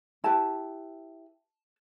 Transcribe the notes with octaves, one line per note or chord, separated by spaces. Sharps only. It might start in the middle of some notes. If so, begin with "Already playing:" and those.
E4 G4 B4 A5